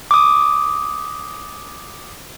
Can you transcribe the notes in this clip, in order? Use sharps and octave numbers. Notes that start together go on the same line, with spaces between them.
D6 D#6